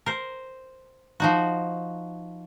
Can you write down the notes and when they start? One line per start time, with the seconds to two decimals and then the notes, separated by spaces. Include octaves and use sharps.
0.06 A#4 C5
1.20 F3 D#4 F#4